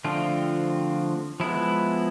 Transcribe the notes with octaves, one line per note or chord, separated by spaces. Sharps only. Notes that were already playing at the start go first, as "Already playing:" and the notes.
D3 F3 A3 C4 F4
F3 G#3 B3 E4